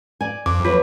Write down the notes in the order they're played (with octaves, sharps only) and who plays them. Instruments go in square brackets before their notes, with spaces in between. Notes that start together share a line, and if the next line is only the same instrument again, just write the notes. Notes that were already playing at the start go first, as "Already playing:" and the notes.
[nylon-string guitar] D5 G#5
[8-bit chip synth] F2 [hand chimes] D6
[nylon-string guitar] D#2 F#3 B4 [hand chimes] F4